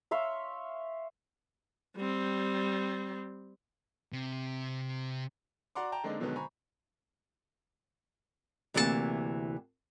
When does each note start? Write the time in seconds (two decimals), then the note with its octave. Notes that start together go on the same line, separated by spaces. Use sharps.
0.11 C#5 E5 F5 C6
1.96 G3 C4
4.12 C3
5.75 F#4 D5 F#5 A#5 C6 D6
5.92 G5 A5 A#5
6.04 D3 G#3 A#3 C4 D4 D#4
6.20 B2 D3 D#3 F#3 G#3 B3
6.36 C5 G#5 A#5 B5 C#6
8.74 D2 C3 E3 A#3 F#4 A5